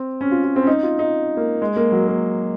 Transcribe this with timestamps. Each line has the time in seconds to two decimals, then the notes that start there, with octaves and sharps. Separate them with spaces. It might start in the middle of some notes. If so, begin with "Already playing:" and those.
Already playing: C4
0.21 C#4
0.31 F4
0.44 F4
0.56 C4
0.62 C#4
0.67 D#4
0.83 F4
0.99 D#4
1.37 A#3
1.62 G#3
1.76 A#3
1.92 F#3
2.08 A#3